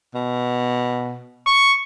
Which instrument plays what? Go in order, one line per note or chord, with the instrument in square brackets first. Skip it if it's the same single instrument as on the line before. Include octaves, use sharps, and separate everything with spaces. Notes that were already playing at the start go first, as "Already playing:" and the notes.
[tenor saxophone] B2
[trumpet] C#6